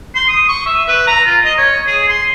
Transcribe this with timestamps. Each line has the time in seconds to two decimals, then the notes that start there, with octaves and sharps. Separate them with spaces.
0.15 C6
0.29 D#6
0.49 C#6
0.66 E5
0.88 B4
1.07 A#5
1.26 F4
1.44 D#5
1.58 C#5
1.87 G#4
2.09 C6